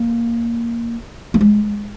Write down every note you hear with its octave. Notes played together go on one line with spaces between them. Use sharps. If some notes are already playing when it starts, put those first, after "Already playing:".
Already playing: A#3
A#3
G#3